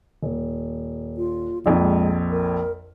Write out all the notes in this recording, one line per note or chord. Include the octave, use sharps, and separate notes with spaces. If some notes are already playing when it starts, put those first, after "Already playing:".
D#1
F4
A#1 F2 D#4
G#3
A#4